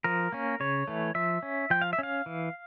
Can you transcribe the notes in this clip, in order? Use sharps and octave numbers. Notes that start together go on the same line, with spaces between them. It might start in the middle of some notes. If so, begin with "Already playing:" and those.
F3 A#4
A#3 C#4
C#3 C#5
E3 A3
F3 E5
C#4
F3 G5
F5
E5
C#4 F5
E3